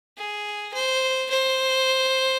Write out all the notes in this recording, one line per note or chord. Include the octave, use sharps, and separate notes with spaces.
G#4
C5
C5